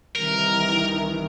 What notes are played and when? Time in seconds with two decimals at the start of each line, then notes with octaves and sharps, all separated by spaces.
0.15 C2 D#3 E3 A#4